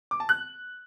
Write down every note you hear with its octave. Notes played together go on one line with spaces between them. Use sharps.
D6
A5
F#6